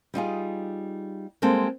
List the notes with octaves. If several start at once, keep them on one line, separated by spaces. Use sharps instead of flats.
G3 D#4 F4 G#4
G3 G#3 A#3 C4 A4